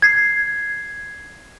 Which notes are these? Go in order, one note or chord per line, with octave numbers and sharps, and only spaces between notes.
G#6 C7